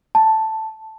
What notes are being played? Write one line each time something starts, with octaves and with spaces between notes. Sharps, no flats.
A5